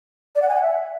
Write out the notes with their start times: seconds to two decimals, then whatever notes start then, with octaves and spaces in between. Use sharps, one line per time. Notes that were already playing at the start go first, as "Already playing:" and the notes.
0.35 D5
0.42 F#5
0.49 G#5
0.55 F#5
0.62 E5